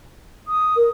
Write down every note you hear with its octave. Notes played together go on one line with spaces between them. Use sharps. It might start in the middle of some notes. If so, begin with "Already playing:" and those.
D#6
A#4